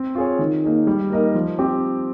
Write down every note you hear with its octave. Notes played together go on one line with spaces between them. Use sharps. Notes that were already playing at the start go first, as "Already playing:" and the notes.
Already playing: C4
F4 G#4 C#5
D#3
A#3 D#4 G#4
G3
A#3 D#4 A#4 D#5
F3
C4 G4